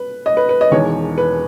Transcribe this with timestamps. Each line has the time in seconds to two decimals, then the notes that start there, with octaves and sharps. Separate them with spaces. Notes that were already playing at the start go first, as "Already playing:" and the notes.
Already playing: B4
0.26 D#5
0.37 B4
0.49 B4
0.61 D#5
0.71 E1 E2 D#3 C#5
1.18 B4